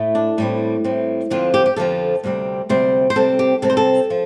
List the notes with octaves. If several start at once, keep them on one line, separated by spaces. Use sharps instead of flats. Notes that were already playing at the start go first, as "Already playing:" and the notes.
Already playing: A2 A3
D4
A2 G3 C4
A2 G3 C4
F2 D3 F3 C4 F4
G4
G4
F2 D3 F3 C4 A4
D2 C3 G3 C4
D2 C3 G3 C4 C5
C5
C3 G3 C4 A4
G4
C3 G3 C4 A4
C5
A4
F3